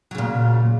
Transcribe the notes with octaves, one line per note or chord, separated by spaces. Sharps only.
A#2 C#3 F#3